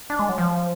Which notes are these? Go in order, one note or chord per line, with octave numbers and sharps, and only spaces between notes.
D4
G#3
F#3
F3